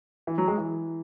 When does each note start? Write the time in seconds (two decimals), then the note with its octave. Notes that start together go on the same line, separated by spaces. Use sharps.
0.27 E3
0.38 F#3
0.48 G#3
0.58 E3